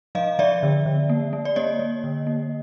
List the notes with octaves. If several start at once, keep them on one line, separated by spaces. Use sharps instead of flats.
F3 D#5 F5
F3 D5 E5
D3
D3
A#3
A#3
D5
A#3 C#5 D#5
A#3
D3
A#3